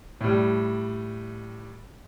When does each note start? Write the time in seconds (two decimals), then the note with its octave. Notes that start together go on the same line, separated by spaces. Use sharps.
0.21 A2 G3